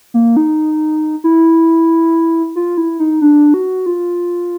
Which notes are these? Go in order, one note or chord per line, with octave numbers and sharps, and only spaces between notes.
A#3
D#4
E4
F4
E4
D#4
D4
F#4
F4